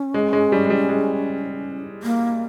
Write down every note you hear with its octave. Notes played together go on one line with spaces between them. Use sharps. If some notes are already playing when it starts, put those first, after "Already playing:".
Already playing: C#4
G#3
G#3
G3
G#3
G3
G#3
A#3